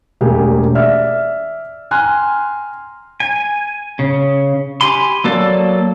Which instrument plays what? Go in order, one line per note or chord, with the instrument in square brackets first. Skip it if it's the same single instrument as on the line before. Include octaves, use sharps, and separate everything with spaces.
[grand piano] E1 A3 A#3 G4 G#4
D5 E5 F6
G5 G#5 A#5 C6 F6 F#6
[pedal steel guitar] G#5
C#3
G4 G#5 B5 C6
F#3 A#3 A4 D5